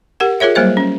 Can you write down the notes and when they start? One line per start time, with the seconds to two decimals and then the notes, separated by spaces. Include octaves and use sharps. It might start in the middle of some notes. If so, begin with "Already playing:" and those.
0.20 G4 A#4 F#5
0.40 F4 G#4 A#4 C#5 E5
0.55 F#3 G3 A#3 C5 D#5
0.77 C#4